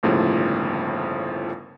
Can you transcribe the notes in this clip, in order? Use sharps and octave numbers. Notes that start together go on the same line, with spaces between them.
G1 D#2 A2 C#3 F3